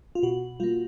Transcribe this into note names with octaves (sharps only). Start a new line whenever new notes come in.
F4
B2 F#4
G3 A#3 F4